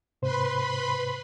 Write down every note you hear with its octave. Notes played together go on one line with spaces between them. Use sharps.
G#2 C3 B4 C5 B5 C6